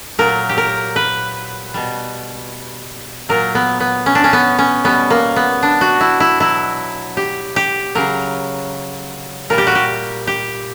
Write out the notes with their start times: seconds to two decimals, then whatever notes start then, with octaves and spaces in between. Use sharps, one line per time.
0.19 A#2 F#3 A#4
0.49 G4
0.58 A#4
0.96 B4
1.74 B2 G3
3.29 A#2 F#3 A#4
3.55 B3
3.80 B3
4.06 C#4
4.15 D4
4.24 C#4
4.33 B3
4.59 C#4
4.84 B2 G3 B3
5.10 A#3
5.36 B3
5.63 D4
5.81 F#4
6.01 E4
6.20 E4
6.40 B2 F#3 E4
7.17 G4
7.56 G4
7.95 C#3 F#3 A#4
9.50 A#2 G3 A#4
9.58 G4
9.67 F#4
9.75 G4
10.27 G4